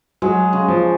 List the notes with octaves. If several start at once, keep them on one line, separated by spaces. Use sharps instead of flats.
F#3 G#3
C#3
F3